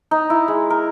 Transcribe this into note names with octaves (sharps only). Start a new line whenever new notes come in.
D#4
E4
G#3
A#4